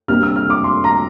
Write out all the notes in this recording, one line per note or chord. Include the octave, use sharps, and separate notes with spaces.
C3 G3 A#3 D4 F6
E6
F6
D6
C6
A#5